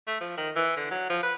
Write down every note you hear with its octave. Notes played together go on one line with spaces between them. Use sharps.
A3
F3
D#3
E3
D3
F#3
F3
B4